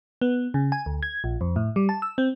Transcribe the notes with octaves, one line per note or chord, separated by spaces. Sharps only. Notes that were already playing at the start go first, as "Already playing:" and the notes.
B3
C#3
G#5
D2
G#6
A#1
F2
A2
G3
A5
E6
C4